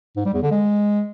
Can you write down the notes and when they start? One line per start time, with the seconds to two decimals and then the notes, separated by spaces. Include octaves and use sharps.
0.17 G#2
0.25 G3
0.34 E2
0.42 D3
0.51 G#3